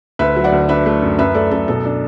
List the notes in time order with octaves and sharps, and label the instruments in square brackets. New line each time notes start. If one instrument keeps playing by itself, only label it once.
[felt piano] D2 B4 E5
F#3
D5 F#5
D2
D4 B4 E5
A3
F#2
F#2 B4 E5
A3 A4 D5
F#2 A4
B2 A4
D4